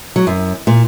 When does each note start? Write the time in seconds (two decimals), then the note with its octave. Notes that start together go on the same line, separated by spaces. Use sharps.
0.16 F#3
0.27 F#2
0.67 A#2